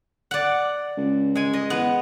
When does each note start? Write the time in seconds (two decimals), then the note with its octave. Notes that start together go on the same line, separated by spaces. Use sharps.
0.31 D5 F#5
0.97 C#2
1.35 G#3 G#5
1.53 D#5
1.70 E2 B3